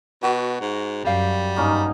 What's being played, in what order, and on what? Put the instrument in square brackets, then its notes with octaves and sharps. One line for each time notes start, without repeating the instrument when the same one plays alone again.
[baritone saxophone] B2 [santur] F#4
[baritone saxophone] G#2
[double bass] F#2 [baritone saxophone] G3 [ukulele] G4 F5
[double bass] G2 D#4 [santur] A#3 C#4